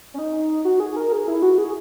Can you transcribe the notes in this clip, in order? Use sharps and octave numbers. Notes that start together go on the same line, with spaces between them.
C#4
D#4
F#4
G#4
A#4
G#4
E4
F#4
G#4